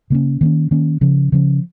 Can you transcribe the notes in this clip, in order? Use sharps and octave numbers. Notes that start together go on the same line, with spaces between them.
C#3 A#3 C#4
D#3 A#3 C#4
D#3 A#3 C#4
C#3 F3 C#4
C#3 F3 C#4